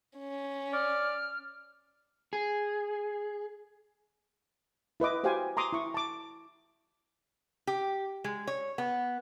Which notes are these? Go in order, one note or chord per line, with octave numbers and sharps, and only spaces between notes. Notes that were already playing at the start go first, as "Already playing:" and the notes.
C#4
D5 F6
G#4
E4 B4 D#5 D6
F#4 G4 C5 F5 G5 G#5
A#5 C6 D6 D#6
E4 C#6
A5 D6
G4
G#3
C#5
B3